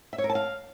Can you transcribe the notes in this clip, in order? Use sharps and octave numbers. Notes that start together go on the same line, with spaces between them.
E5
C#5
A#4
A5
F5